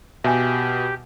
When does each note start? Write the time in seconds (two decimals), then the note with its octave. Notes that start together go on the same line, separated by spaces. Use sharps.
0.24 B2 G4 E5 G#5